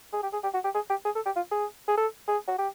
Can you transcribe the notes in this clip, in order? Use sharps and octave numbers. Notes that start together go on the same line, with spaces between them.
G#4
G4
G#4
G4
F#4
G4
G#4
G4
G#4
A4
G4
F4
G#4
G#4
A4
G#4
F#4
G4